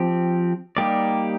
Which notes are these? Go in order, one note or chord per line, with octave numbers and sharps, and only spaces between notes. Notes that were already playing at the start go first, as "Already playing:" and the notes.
Already playing: F3 C4 G4
G3 A#3 D#4 G4 D5